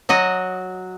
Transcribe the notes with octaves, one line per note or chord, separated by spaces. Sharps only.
F#3 F#4 D#5